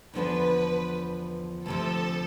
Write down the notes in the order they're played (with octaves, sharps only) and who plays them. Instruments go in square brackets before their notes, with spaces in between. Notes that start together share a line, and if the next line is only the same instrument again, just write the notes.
[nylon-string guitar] E2 D3 F3 B3 D4 [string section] B4
[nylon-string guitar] D2 C3 F3 [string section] A4